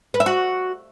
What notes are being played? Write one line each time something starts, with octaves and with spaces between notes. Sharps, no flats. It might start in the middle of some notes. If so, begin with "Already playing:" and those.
B4
E5
F#4